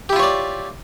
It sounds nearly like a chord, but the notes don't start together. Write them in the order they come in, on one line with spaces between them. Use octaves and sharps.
G4 E4 F4 C#5 D5